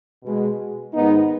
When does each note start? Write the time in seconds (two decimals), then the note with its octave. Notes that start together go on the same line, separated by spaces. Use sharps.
0.23 B2 G#3
0.94 G#2 D#3 G#3 B3 D#4